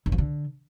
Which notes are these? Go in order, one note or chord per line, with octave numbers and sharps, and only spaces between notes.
G2
F3
D3